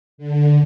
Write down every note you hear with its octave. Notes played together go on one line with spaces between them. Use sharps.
D3